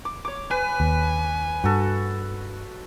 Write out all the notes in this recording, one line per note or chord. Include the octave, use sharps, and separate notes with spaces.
D6
C#5 D6
B4 G#5
D#2
G2 F#4 A4